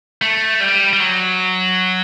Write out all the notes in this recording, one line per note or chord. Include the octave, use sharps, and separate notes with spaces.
A3
G3
G3
F#3